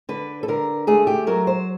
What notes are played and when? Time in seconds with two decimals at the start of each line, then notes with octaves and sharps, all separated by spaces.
0.09 D3 B4
0.43 A4
0.48 D3 A#4
0.87 A3 G#4
1.07 G4
1.27 F#3 A#4
1.47 C5